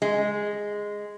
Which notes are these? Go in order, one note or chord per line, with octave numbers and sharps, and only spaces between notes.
G#3